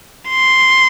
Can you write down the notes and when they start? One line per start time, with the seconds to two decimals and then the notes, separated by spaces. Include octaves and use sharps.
0.29 C6